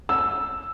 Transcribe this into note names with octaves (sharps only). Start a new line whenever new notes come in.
E6